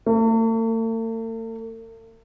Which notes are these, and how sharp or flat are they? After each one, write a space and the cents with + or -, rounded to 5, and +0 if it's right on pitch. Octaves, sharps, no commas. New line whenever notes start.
A3 +45